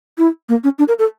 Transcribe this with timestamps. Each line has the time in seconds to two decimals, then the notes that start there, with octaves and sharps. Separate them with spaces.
0.18 E4
0.49 A#3
0.64 C#4
0.79 D4
0.88 A#4
0.99 A4